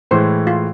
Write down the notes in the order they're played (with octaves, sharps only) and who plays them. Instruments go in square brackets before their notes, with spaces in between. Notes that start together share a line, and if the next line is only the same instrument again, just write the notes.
[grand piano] A2 E3 G#3 [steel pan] C5
[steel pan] F4